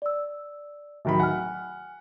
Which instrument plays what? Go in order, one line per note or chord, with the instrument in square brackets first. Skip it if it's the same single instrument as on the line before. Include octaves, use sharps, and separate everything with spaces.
[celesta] D5 E6
[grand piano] D1 D#3 B5 [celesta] E5
[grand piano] F#5 [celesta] G#5 F6